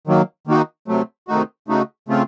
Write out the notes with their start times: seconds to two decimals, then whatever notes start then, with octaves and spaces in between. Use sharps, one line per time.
0.07 D#3 F#3 A#3
0.47 D#3 A#3 D#4 F#4
0.88 C3 F#3 A3
1.28 C3 D#3 A3 D#4 F#4
1.68 C#3 A3 D#4 F#4
2.08 C#3 A3 C4 F4